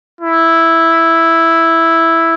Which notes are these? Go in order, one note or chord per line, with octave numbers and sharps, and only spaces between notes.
E4